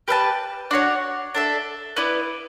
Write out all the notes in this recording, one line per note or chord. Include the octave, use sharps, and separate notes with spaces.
G4 B4 E5 A5
D4 F#4 C#5 F#5
D4 A4 E5
B3 E4 B4 D5